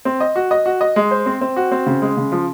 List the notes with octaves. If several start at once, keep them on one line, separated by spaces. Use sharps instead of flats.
C4
D#5
F#4
D#5
F#4
D#5
G#3
C5
C4
C4
F#4
C4
C#3
G#3
C#3
F3